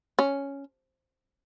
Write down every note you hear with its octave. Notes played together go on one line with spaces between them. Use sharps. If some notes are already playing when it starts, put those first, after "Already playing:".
C#4